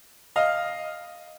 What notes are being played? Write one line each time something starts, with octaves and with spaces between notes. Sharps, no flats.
D#5 F5